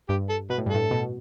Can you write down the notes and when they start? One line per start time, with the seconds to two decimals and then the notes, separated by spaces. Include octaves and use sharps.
0.09 G2 G4
0.30 A4
0.50 B2 B4
0.58 A2
0.66 G2
0.70 A2 A4
0.91 B2